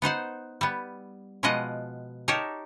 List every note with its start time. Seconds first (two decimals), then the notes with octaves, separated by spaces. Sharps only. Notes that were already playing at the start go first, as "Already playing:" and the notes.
0.02 B3 D#4 C5 F#5
0.61 G3 B3
1.43 B2 F3 G#3 F4 D#5 F#5
2.28 D#4 G4 A#4 C#5 A5